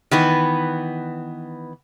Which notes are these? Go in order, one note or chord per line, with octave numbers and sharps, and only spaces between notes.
D#3 E3 B3 B4